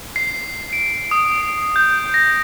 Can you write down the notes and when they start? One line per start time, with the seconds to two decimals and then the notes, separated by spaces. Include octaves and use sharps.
0.16 C7
0.73 D7
1.11 D#6
1.41 D7
1.76 G6
2.14 A#6